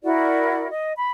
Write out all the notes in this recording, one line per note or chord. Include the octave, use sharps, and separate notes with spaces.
E4 F#4 A#4 D5
D#5
B5